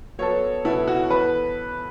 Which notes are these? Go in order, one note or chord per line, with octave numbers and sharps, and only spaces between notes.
F#3 B3 A4 C#5
B2 F#3 B3 E4 A4
F#4
E3 B3 A4 B4